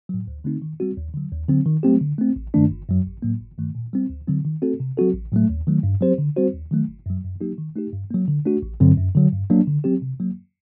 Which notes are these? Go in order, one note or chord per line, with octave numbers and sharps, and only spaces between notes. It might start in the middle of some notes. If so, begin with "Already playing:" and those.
A2 F#3
D2
D3 A3 C4 D#4
D#3
G3 C4 F#4
D#2
D3 F#3
D#2
D3 F#3 C4
D#3
F#3 A3 C4 G4
D3
A3 C4
A1
G2 D#3 A3 D4
G1
F#2 F#3
A1
A2 F#3 A#3
G1
G2 D#3 A3
A#2
G3 C4
D2
D3 F#3 C4
D#3
A3 C4 F#4 A4
C3
F#3 C4 F#4 A4
A1
A2 F#3 A3
D#2
D#3 F#3 A3
G2
F#3 C4 G4 C5
D3
G3 C4 F#4 C5
D#2
D#3 F#3 A3
G1
F#2 F#3
F#2
F#3 A#3 D#4 G4
D#3
A3 D#4 G4
G2
F#3 A#3
D3
A3 D4 F#4
A1
G2 D3 F#3 C4
F#2
D3 F#3
G2
F#3 A#3 D4
D3
F#3 C4 G4
C3
F#3 A#3